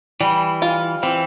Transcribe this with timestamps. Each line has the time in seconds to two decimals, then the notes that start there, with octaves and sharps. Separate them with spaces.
0.20 E3 G3
0.62 F4
1.03 E3 C4